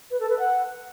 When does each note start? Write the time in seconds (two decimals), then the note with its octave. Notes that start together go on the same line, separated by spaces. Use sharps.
0.11 B4
0.20 A4
0.29 B4
0.38 F#5